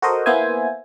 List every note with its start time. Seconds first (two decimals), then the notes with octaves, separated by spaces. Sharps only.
0.02 F#4 A4 A#4 C5 D#5
0.26 A#3 B3 E4 C5 E5 G#5